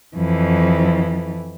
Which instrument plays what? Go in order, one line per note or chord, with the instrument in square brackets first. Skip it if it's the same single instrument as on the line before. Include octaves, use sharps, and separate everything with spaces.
[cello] F2 E3